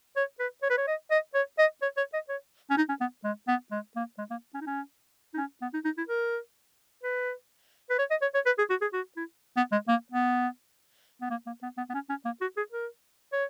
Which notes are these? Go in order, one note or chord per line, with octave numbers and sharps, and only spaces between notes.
C#5
B4
C#5
B4
C#5
D#5
D#5
C#5
D#5
C#5
C#5
D#5
C#5
C#4
D#4
C#4
B3
G#3
B3
G#3
A#3
G#3
A#3
C#4
D#4
C#4
D#4
C#4
B3
D#4
D#4
E4
A#4
B4
B4
C#5
D#5
C#5
C#5
B4
G#4
F#4
G#4
F#4
E4
B3
G#3
A#3
B3
B3
A#3
A#3
B3
B3
B3
C#4
C#4
A#3
F#4
G#4
A#4
C#5